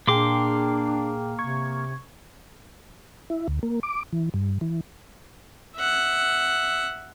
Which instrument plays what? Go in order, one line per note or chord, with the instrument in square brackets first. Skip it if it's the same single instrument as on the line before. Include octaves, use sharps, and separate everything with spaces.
[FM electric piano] A#2 G#4 G5 [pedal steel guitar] A#3 C6 D6 [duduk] D4
[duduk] C3 [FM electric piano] C#6 G#6
[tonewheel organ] E4
D2
A#3
D6
E3
G2
E3
[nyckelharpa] E5 F#5